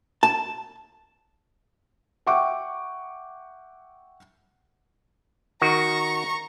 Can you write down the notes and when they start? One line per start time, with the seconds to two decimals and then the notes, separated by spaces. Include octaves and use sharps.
0.23 A5
2.27 E5 F#5 G5 C#6 D6
5.62 D#3 F#4 A#5 C#6